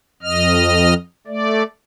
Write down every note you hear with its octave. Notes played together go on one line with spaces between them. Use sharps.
F2 D#5 F6
A3 D5